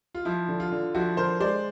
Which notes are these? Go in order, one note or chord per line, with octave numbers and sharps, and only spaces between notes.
F4
F3 E4
D3
F4
D3
F3 E4 F#4
D3 A#4 C5
G#3 C5 D5